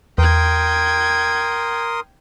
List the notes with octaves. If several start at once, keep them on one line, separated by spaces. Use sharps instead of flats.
E2 A#4 G5 C6 D#6 G#6